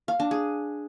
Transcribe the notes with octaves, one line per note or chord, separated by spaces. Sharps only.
F5
D4
G#4